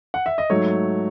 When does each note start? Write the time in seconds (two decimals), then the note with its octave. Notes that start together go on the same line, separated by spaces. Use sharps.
0.14 F#5
0.26 E5
0.38 D#5
0.50 G#2 F#3 A3 C#5